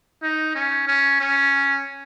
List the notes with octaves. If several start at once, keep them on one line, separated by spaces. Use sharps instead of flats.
D#4
C#4
C#4
C#4